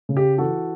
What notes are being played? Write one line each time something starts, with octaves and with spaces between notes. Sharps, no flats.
C#3
G4
E3 F#4 A4